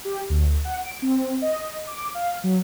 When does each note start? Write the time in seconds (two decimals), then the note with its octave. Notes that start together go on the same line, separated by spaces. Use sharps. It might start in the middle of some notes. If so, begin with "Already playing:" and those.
0.05 G4
0.30 D2
0.65 F#5
0.84 D7
1.02 C4
1.42 D#5
1.87 D6
2.14 F5
2.44 F#3